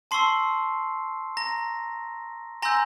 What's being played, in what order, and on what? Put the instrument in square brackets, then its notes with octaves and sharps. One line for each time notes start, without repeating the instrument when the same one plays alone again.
[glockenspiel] A5 C6 C#6 E6 C7
A#5 A#6
G#5 A#5 C6 E6 G6 A#6